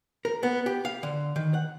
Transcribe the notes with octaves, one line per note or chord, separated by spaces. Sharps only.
A#4
B3
G4
F5
D3
D#3
F#5